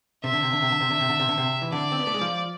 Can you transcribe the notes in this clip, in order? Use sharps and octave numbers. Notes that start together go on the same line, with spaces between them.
C3 E5
D3
C3
D3
C3
D3
C3
D3
C3
D3
C3
D3
C3
E3
D3 D5
C4
B3
A3
G#3
F3